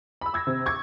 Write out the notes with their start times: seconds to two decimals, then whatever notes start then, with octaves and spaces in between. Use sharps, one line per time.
0.21 B5 E6
0.33 D6 E6 G#6 A#6
0.47 C3
0.66 C#6 D6 G#6